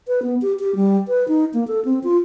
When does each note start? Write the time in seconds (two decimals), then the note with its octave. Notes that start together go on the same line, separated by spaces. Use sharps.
0.08 B4
0.23 B3
0.42 G4
0.60 G4
0.75 G3
1.08 B4
1.28 D#4
1.54 A#3
1.68 A4
1.85 C4
2.04 F4